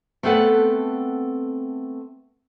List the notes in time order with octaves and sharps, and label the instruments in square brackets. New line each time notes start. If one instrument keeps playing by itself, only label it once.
[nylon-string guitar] A3 B3 C4 A4 B4 F#5